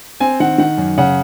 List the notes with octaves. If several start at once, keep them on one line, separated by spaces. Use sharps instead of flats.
C4 G#5
D#3 F#5
D#3 F#5
F#2
C#3 F#5